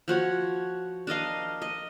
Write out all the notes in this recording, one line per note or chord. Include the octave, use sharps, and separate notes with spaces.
F3 F#4 C#5
D4 A#4 D#5 F5
D#5